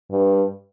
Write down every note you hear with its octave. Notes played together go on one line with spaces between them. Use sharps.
G2